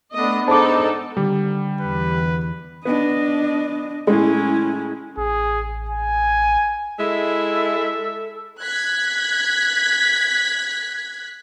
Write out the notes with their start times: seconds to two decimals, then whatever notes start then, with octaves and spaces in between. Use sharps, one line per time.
0.14 A3 B3 D4 D#5
0.48 G#2 D4 D#4 A4 A5 D6
1.17 D3 G3
1.81 E2 B4
2.85 B3 D4 D#5
4.07 A2 G#3 C#4 E4
5.17 A1 G#4
5.89 G#5
6.99 G#3 E4 A4 E5
8.62 F#6 G#6 B6